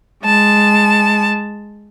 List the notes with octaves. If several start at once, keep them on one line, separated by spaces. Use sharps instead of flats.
G#3 A5